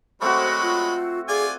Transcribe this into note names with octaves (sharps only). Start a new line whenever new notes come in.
F#3 G#3 A3 C4 F#4 C5 B5
F4
F4 G#4 D5 G#5